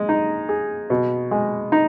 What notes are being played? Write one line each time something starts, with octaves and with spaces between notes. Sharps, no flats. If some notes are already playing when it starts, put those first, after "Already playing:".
Already playing: G#3
D#4
G#4
B2
G#3
D#4